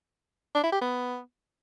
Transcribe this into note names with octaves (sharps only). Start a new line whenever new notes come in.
D4
E4
G4
B3